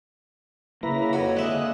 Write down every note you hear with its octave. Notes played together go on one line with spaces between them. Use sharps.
C#3 A#3 E4 B4 A#5
F2 F#4 C#5
D3 G#3 D#5 E5 F#6